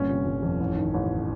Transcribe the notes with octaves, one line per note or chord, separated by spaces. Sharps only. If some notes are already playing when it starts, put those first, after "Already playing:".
Already playing: G1 A#2 C#4
C3
G1
F2
A1
D#3
A1